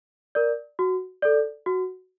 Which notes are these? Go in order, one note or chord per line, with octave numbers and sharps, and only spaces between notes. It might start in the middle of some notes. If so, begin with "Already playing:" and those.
A#4 D5
F#4
A4 D5
F#4